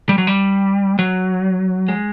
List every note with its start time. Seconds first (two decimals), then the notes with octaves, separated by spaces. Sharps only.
0.09 G3
0.18 F#3
0.27 G3
0.99 F#3
1.88 G#3